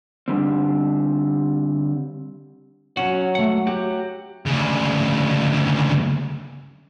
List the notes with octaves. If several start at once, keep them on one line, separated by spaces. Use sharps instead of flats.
D3 G3 C4
F#3 C#4 F#4
A3 F#5
F#4 G4
D2 C#3